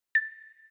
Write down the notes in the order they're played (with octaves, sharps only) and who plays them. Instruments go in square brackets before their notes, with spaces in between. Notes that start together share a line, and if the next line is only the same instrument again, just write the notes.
[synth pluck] A6